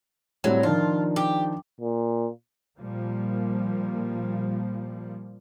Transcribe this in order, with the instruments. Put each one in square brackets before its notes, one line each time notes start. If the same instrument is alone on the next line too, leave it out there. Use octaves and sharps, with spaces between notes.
[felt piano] A2 G3 C4 [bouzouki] F#3
[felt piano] D#3 F3 D4 [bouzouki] F4
[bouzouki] G4
[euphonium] A#2
[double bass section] A#2 F3 G3 A#3